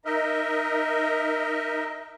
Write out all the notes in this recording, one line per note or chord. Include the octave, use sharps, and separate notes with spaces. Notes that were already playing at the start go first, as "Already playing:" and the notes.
D#4 A#4 D#5 E5